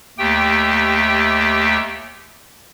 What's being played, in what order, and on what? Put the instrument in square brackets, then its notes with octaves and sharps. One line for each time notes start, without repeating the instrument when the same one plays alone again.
[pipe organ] D#2 A3 G4 G5